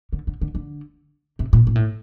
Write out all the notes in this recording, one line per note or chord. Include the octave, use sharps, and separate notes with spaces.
D3
D3
D3
D3
C3
A#2
A#2
A2